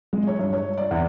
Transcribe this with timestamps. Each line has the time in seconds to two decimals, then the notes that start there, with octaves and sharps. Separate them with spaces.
0.13 G#3
0.27 C#5
0.39 G2
0.53 C#5
0.78 D5
0.91 E2